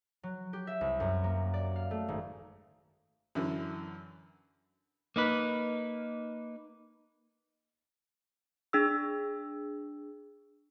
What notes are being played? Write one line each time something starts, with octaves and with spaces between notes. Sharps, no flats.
F#3
G4
E5
C2
F#2
A#3
D5
F5
A3
G#1
F#2 D3 E3
A#3 D#4 B4
D4 G#4 E6